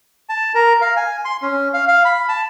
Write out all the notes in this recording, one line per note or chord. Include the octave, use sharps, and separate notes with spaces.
A5
A#4
F5
G#5
C6
C#4
F5
F5
B5
A5